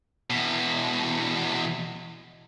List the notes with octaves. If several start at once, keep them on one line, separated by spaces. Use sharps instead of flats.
E2 B2